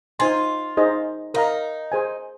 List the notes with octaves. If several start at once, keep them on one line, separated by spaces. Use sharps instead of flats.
D#4 F4 C5 G#5 C6
D#4 G#4 C5 D#5
D#4 A#4 F5 A#5
G#4 C5 G#5